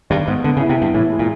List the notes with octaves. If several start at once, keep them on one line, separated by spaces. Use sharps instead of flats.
G2 D#3
G#2 B3
D3 B3
C#3
E4
C3
G2 B3
A2 E3
G#3
A#2